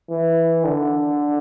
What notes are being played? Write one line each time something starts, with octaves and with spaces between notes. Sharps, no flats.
E3
D3